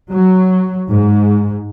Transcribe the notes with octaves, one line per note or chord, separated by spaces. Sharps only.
F#3
G#2